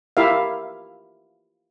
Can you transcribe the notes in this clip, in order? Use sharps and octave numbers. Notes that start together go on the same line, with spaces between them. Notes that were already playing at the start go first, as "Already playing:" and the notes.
E4 F4 G4 A#4 E5 F5